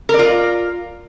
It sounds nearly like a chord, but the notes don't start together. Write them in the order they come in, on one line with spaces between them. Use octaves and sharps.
A#4 D5 F4